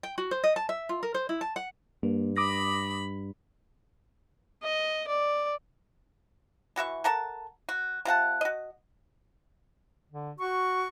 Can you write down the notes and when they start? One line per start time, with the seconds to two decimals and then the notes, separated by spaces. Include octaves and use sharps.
0.03 G5
0.18 F#4
0.31 C5
0.44 D#5
0.56 A5
0.69 E5
0.89 F4
1.03 A#4
1.14 C5
1.29 E4
1.41 A5
1.56 F#5
2.03 G2 A#3
2.36 B5 D6 D#6 A#6
4.63 D#5
5.08 D5
6.76 E3 F#4 E5 C#6
7.04 A4 A#4 F#5 A5
7.69 F#4
8.05 C3 F4 F#5 A5
8.41 F#4 D#5
10.11 D3
10.39 F#4 C#6